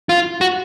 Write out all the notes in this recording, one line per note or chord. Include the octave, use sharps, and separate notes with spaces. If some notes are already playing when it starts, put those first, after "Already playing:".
F4
F#4